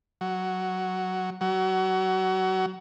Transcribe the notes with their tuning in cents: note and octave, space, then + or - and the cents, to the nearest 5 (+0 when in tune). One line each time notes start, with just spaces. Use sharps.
F#3 +5
F#3 +25